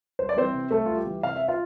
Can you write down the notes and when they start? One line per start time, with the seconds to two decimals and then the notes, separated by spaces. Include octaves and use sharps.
0.19 C2 C5
0.29 D5
0.37 E3 C4 C5
0.54 C3
0.71 C2 A3 A4
0.86 C2 F4
0.97 G4
1.06 E3
1.23 C3 F5
1.36 E5
1.48 F4 F5